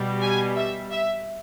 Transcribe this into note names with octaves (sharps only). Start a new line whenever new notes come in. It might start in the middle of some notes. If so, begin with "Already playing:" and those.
Already playing: B2 G3
G#5
E5
E5